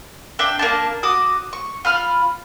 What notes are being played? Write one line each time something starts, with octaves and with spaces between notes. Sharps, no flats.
D4 E5 G5 G6
A#3 D4 A5
F#4 D6 D#6
C#6
F4 B5 F6